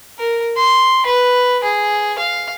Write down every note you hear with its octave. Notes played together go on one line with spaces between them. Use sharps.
A#4
C6
B4
G#4
F5